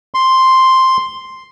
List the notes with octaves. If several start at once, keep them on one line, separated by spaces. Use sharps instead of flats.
C6